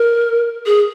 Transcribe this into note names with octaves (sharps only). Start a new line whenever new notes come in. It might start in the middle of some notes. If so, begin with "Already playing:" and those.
Already playing: A#4
G#4